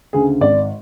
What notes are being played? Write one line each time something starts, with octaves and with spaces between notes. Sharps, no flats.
D2 C#3 G#4
G#1 D5